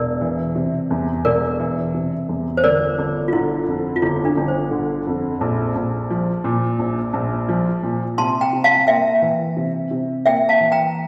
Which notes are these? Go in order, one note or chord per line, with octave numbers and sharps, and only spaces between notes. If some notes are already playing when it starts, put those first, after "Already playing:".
Already playing: E1 A#4 D5
E3
C3
E2
E1 A#4 D5
E3
C3
E2
C5
G1 A#4 D5
G1
F4
D3 E4
F2
F4
G1 E4
D4
G1
C5
D3
F2
A#1
A#1
F3
A#2
A#1
A#1
F3
A#2
C3 A5 C6
G5 A#5
C3
F5 A5
A#3 E5 G5
E3
C3
C3
A#3 E5 G5
F5 A5
E3
G5 A#5